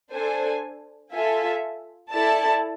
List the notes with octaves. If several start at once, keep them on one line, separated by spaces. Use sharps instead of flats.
D4 A4 C5 G#5
F4 A4 E5 G#5
E4 A4 D5 A5